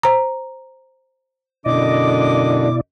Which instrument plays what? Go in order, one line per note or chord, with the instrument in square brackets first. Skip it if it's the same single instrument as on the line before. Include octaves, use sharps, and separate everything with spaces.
[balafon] C5 A#5
[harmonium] F#2 D3 D4 [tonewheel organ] B2 E4 D5 [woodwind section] D#5 D6